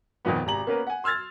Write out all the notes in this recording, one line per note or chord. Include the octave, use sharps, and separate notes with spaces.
F2 A#2 D#3 F3 B3
G#1 C3 A#5 F#7
A#3 B3 C#4 A#4 B4
F#5 G#5
C6 E6 F6 G#6 A6